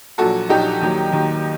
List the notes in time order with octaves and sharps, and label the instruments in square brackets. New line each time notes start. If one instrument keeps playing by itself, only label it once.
[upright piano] A#1 A#2 F#3 F#4 A4
A#1 A#2 F#3 D#4 G4
D#2 D#3 F#3
D#2 D#3 F#3